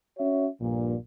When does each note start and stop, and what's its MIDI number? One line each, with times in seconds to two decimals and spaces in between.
0.18 0.47 61
0.18 0.47 66
0.18 0.47 73
0.18 0.47 76
0.61 0.95 34
0.61 0.95 43
0.61 0.95 46